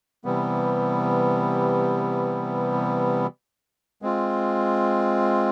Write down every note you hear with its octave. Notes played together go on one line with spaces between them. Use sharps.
C3 E3 G3 B3
G#3 C4 F4